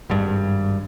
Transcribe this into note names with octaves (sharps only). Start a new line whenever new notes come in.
G#1 G2